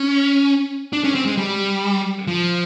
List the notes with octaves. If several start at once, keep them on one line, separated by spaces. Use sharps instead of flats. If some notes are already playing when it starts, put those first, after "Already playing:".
Already playing: C#4
D4
C#4
C4
G#3
G3
F3